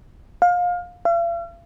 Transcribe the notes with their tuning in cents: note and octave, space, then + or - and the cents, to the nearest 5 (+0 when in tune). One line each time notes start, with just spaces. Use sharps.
F5 +25
F5 -45